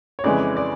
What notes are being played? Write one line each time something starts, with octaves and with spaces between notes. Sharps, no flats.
C#5
F2 C#3 E3 G#3 D5
D5